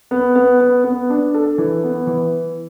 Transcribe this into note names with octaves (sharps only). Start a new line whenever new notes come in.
B3
B3
B3
B3
D4
A4
E3
B3
E3